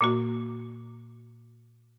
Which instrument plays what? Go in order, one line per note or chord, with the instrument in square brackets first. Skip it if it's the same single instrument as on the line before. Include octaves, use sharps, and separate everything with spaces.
[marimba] A#2 A#3 F#4